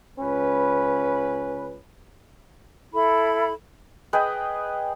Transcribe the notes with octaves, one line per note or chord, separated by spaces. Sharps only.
C#2 C#4 B4
E4 A4 B5
G#4 B4 D#5 G5